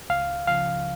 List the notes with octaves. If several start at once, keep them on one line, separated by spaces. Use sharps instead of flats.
C#2 F5
C#3 F3 F5